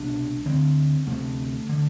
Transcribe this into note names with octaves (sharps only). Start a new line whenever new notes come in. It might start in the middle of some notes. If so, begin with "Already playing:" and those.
Already playing: C2 B2 D4
D2 D3 C4
D2 C3 A3
D3